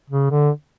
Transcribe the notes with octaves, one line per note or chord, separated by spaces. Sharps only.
C#3
D3